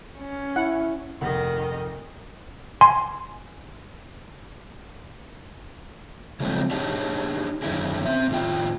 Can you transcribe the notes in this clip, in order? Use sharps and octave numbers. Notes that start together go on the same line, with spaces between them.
C#4
E4 F#5
F1 D#3 D#5 F#5
G#5 C6
C#3 F3 F#3 G#3 A3 C4
D4 D#4 G4 G#4 C#5 D5
F#2 D3 D#3 C#4 E4 G#4
C4 E5
A2 D#3 F4 G5